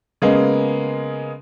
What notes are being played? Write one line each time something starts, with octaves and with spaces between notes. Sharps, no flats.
C#3 G#3 A#3 B3